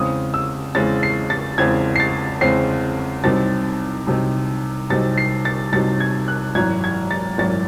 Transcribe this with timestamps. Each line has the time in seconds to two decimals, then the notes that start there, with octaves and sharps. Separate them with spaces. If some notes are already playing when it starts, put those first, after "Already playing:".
Already playing: E2 C#3 G#3 C4 D#6
0.34 E6
0.75 E2 C#3 G#3 C4 A6
1.03 C7
1.30 A6
1.58 E2 C#3 G#3 C4 G#6
1.96 C7
2.00 A6
2.41 E2 C#3 G#3 C4 C7
3.24 C2 C3 F#3 C4 D#4 A6
4.07 C2 C3 F#3 C4 D#4
4.90 C2 C3 F#3 C4 D#4 A6
5.18 C7
5.45 A6
5.72 C2 C3 F#3 C4 D#4 A6
6.00 G#6
6.28 F#6
6.55 G#1 F#2 E3 G#6
6.84 G#6
7.11 A6
7.38 G#1 F#2 E3 A6